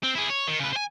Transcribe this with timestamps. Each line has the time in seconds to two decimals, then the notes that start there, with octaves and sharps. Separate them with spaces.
0.03 C4
0.15 E4 G#4
0.30 C#5
0.48 D#3
0.60 C#3 B4
0.73 C5 G#5